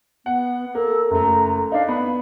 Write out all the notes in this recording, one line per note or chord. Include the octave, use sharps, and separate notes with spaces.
B3 F#5
A#3 A4
F#1 A3 A#5
D4 D#4 F5
B3 B5